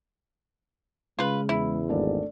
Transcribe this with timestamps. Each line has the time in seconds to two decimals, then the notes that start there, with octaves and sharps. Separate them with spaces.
1.19 C#3 G#3 F4 B4
1.49 E2 E4
1.89 G#1 A3 D4 D5